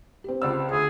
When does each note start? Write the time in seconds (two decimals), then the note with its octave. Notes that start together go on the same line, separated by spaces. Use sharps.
0.24 C4 G4
0.42 C#2 D5 E6
0.71 D2 G#4